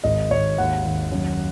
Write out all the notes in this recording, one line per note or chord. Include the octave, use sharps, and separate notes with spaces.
G#1 D#5
G#1 C#5
D#2 F#5
D#2
F#2